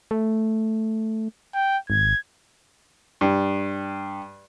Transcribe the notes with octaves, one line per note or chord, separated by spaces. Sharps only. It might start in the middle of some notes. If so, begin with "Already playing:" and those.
A3
G5
G#1 G#6
G2